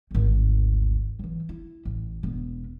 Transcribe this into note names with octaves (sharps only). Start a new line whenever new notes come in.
G#1 D2
E3 F#3
E4
A1
E1 B3